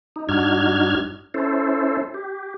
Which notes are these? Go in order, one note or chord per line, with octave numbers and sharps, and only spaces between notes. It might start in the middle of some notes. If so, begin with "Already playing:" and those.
D#4
G2 D4 D#4 F#4 F6 G#6
C#4 E4 A4 C5
G4